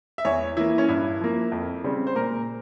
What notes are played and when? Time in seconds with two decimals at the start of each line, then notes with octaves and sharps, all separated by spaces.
0.18 E5
0.25 E2 C#5
0.57 E3 A#3 E4
0.78 C#4
0.89 G2 E4
1.20 F3 A#3
1.52 F2
1.84 C#3 G3 C4
2.07 C5
2.15 A#2 A#4